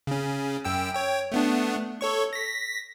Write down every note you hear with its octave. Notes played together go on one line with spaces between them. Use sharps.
C#3 C#4
F#2 G5 E6
C#5 G5
A3 B3 D4
A4 C#5 C#6
A#6 B6